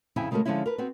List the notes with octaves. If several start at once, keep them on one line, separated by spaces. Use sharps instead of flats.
F2 C#3 E4 E5 G5 G#5
C#3 G#3 A3 B3 F#4 A#4
D3 F3 G#3 C#4 E4
A#4 B4
B3 C4 F#4